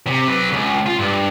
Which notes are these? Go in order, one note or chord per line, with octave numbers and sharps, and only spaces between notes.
C3
F#3 B4
C#2
F4
G2